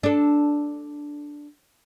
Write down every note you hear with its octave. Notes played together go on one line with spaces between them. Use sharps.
D4 A4